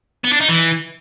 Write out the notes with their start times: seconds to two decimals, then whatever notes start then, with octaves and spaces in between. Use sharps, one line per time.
0.24 B3
0.33 D4
0.41 D#4
0.49 E3